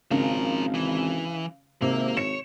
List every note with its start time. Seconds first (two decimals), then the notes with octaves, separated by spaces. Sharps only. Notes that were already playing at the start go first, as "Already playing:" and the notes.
0.11 G#1 C#3 F3 A#4
0.75 E3
1.82 G#1 C3 A#3
2.17 C#5 C#7 E7